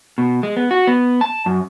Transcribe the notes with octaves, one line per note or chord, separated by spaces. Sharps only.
B2
G#3
B3
F#4
B3
A5
F#2